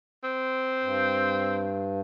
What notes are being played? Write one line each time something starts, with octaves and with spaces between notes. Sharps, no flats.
C4
G2